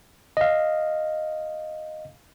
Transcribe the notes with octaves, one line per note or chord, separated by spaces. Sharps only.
D#5 F5